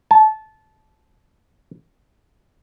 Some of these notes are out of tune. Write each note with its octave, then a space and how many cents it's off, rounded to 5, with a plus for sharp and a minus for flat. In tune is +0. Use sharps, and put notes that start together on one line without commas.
A5 -20